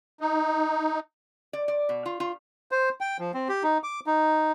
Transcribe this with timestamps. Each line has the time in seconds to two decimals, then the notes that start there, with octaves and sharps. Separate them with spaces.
0.21 D#4
1.53 D5
1.68 D5
1.89 B2
2.06 F4
2.20 F4
2.71 C5
3.01 G5
3.19 F3
3.34 C4
3.49 G4
3.63 D#4
3.84 D6
4.07 D#4